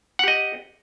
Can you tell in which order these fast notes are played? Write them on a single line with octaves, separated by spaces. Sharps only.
F#5 G4 D#5